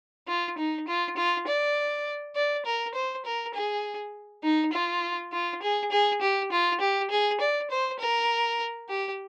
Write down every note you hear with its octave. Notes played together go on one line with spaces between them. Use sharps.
F4
D#4
F4
F4
D5
D5
A#4
C5
A#4
G#4
D#4
F4
F4
G#4
G#4
G4
F4
G4
G#4
D5
C5
A#4
G4